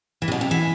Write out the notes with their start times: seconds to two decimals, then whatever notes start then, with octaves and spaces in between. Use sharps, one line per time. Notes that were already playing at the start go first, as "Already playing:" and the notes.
0.22 E3
0.28 C3
0.32 B2
0.41 C3
0.51 E3